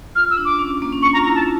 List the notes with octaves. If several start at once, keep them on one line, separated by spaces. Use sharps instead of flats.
F4 F6
E6
D4
D6
C#4
A#3
C#4
D4 C#6
F4 A#5
E4 A#5
A5